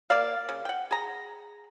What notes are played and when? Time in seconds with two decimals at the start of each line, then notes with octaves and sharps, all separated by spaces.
0.10 A#3 A#4 D5 F5
0.49 C#3
0.65 F#5 G5
0.91 G#4 A#5